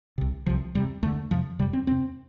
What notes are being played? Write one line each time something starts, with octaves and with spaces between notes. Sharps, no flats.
C2 C3
C2 C3 F3
E2 C3 G3
E2 D3 A3
F2 C3 F3
F2 C3 G3
C4
E2 C3 C4